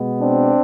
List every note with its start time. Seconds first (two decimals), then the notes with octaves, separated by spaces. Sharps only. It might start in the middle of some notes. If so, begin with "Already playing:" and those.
Already playing: B2 G#3 B3
0.22 C4 D4